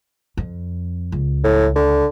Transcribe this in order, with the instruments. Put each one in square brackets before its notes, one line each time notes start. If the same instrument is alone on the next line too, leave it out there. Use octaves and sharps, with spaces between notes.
[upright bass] F2
C#2
[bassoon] A2
D3